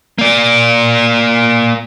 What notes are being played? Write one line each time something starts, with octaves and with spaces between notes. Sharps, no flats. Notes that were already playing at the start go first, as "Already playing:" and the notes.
A#3 D5